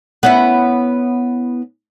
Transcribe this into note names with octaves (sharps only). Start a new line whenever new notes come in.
B3 C#4 E4